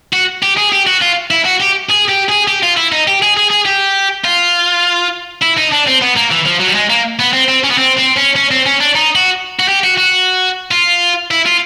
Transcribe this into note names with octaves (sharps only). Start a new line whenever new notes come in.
F#4
G4
G#4
G4
F#4
F4
E4
F#4
G4
G#4
G4
G#4
G4
F4
E4
D#4
G4
G#4
G#4
G#4
G4
F4
E4
D#4
D4
C4
B3
A#3
E3
F3
F#3
G3
G#3
A#3
B3
C4
C4
C#4
B3
C4
C4
C#4
C#4
C4
C#4
D4
D#4
F#4
F#4
G4
F#4
F#4
F4
E4
F4